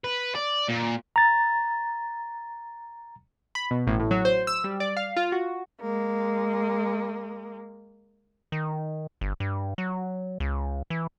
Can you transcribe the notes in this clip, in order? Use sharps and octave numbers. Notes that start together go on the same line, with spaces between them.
B4
D5
A#2
A#5 A6
B5
B2
A1
A2
F#3
C5
E6
G3
D5
F5
F4
F#4
G#3 A#3
D#3
G1
G2
F#3
C#2
E3